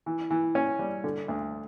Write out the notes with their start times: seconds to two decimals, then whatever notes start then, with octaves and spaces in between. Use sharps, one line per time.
0.06 E3
0.30 E3
0.55 C#4
0.79 G3
1.04 D3
1.28 D2